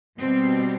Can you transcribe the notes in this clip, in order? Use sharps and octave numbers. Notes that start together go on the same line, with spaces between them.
B2 G3 C4